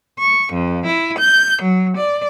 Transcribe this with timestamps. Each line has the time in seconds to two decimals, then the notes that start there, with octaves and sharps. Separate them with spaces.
0.18 C#6
0.51 F2
0.86 E4
1.18 G6
1.60 F#3
1.97 D5